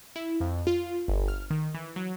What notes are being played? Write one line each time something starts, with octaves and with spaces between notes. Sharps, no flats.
E4
F2
F4
G1
F6
D#3
E3
F#3